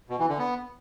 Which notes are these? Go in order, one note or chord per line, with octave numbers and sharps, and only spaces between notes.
B2
E3
D3
B3